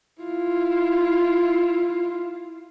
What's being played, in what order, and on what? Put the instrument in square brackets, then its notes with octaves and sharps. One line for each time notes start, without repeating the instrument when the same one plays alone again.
[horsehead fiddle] E4 F4